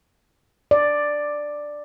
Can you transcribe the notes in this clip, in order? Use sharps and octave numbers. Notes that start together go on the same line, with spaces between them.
D5